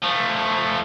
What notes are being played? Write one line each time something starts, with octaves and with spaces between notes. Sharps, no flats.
F3 A3